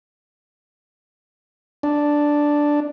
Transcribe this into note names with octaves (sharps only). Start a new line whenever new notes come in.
D4